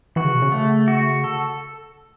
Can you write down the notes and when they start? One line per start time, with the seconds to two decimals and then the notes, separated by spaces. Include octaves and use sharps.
0.16 E3 F#4
0.25 C#3
0.34 B2
0.42 C#3
0.52 A3
0.88 F#4
1.24 A4